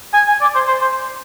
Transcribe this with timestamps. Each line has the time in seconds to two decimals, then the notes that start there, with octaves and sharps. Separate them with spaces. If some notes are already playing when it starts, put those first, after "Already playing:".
0.14 G#5
0.28 G#5
0.41 D5
0.55 C5
0.68 C5
0.82 C5